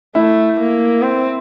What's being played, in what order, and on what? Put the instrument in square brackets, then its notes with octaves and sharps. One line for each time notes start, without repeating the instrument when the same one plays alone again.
[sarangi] A3 [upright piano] E4
[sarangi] A#3
C4